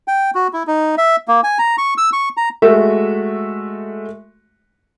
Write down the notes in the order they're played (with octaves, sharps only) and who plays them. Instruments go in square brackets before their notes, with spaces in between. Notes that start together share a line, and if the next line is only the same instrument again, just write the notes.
[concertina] G5
F#4
E4
D#4
E5
A#3
G#5
A#5
C#6
E6
C#6
A#5
[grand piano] G#3 A3 F#4 E5